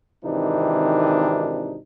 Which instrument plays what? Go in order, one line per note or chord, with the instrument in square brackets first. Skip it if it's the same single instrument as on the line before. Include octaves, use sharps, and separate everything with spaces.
[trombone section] G#1 C3 D#3 E3 D4 D#4